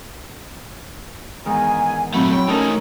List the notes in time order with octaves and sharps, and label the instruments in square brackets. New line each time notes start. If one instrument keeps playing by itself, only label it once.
[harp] E2 G#2 D#3 [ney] G#5
[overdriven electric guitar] A#2 A3 [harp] F#3 C4 E4 [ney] B5
[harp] E4 C#5 [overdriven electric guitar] G5 [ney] B5
[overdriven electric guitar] A3 D#4 [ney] C#4 [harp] A4 A#4 C#5